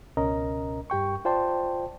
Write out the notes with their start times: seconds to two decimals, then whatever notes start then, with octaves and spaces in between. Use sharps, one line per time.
0.17 C#2 B2 C#4 A#4 D#5 A#5
0.90 G2 G4 G5 C#6
1.25 F4 C5 D5 G5 A5 C6